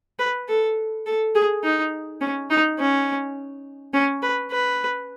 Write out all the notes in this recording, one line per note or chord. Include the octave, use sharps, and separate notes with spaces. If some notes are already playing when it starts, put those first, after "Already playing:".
B4
A4
A4
G#4
D#4
C#4
D#4
C#4
C#4
B4
B4